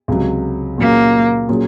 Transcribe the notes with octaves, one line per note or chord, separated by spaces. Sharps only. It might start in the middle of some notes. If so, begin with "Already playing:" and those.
C#2 C3 F#3
A#2 F#3 A#3 C#4 G#4
A#2 F#3 C#4 G#4